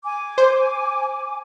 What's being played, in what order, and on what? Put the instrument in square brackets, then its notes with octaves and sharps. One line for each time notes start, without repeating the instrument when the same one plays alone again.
[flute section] G#5 D6
[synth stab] C5